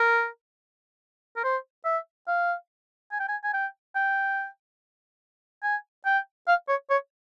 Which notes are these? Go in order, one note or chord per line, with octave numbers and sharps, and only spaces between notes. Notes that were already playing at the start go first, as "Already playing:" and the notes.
Already playing: A#4
A#4
C5
E5
F5
G#5
G5
G#5
G#5
G5
G5
G#5
G5
F5
C#5
C#5